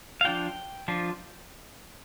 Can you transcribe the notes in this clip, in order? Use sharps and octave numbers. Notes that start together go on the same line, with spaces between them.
F5
F3 D4 F4 G5
F3 D4 F4